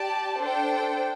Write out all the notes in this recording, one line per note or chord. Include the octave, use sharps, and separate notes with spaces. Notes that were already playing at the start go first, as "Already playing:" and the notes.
Already playing: G4 D5 A5
D4 A4 C5 G5